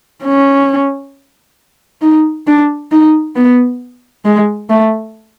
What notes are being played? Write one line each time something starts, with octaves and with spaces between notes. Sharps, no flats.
C#4
D#4
D4
D#4
B3
G#3
A3